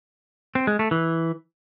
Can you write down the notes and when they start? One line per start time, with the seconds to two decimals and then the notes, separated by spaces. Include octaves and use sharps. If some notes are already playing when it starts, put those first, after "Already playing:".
0.55 C4
0.67 G#3
0.79 A3
0.91 E3